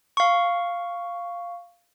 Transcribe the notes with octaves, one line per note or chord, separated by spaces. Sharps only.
F5 C#6